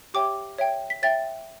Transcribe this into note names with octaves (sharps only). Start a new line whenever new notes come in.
G4 C#5 E5 G5 D6
C#5 E5 G5
B6
C#5 E5 G5 A6